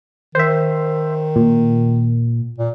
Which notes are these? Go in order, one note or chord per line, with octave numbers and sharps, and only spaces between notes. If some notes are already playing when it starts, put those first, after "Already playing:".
D#3 C5 E5
A#2
A#2